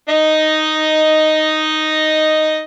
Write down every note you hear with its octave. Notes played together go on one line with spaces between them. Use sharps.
D#4 D#5